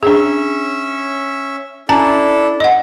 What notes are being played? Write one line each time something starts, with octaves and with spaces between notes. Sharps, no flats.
C#4 D4 G#4 E5
C#4 D4 E4 A4 A5 A#5
D#5 F#5